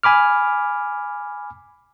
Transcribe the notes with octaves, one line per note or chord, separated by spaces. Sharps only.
G#5 B5 D6 F6